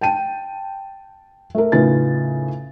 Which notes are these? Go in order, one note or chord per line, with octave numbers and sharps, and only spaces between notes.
G5 A5 D#7
A3 A#4
A2 C#3 D#4 F4 B4 A6